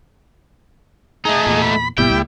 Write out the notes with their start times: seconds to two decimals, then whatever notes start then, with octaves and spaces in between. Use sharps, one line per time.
1.25 A3 D#4 G#4 D#5
1.47 E2 A#2
1.62 B5
1.98 F#1 A#2 G3 B3 E4 G5
2.10 C#2 G#3 A#3